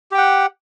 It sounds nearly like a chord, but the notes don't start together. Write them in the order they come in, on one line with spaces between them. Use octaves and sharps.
G4 G5 F#5